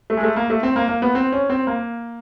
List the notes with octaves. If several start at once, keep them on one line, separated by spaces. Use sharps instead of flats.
A3
G#3
A3
A#3
A3
C4
A#3
A#3
B3
C4
C#4
C4
A#3